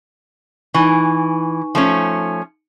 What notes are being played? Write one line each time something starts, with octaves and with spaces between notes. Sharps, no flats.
E3 D#4 G#5 C#6
F3 A3 C#4